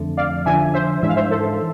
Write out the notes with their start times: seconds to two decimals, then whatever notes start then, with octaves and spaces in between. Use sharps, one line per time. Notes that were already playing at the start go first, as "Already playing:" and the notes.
Already playing: F2 D3 A3
0.17 D5 F5
0.46 D3 F3 A3 D4 E5 G#5
0.74 C5 E5
1.02 G#2 E3 G#3 D4 E5
1.09 F5
1.16 C5 E5
1.31 A4 C5